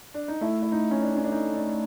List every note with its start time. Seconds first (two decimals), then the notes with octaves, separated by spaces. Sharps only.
0.14 D4
0.28 D#4
0.41 A3 E4
0.62 E4
0.72 D#4
0.91 C#4
1.02 D4
1.16 C#4
1.24 D4
1.32 D#4
1.55 D4